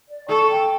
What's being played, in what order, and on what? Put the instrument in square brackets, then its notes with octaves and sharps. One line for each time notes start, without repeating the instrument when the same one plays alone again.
[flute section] D5
[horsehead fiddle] A4 [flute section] C#6
[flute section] G5